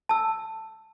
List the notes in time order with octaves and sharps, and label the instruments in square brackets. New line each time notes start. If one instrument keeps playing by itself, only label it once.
[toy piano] A5 E6